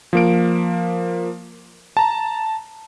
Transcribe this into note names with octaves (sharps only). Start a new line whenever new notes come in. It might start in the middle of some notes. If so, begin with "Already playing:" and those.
F3 A#3 D7
A5 A#5